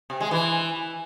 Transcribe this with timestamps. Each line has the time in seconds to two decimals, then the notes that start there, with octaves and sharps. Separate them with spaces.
0.10 C3
0.20 G#3
0.31 E3